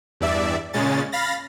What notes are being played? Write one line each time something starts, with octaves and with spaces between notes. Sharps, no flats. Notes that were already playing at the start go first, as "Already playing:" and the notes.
E2 G2 D5 E5
A#2 C#3 G#3 C#4 A6
F5 B5 A6 A#6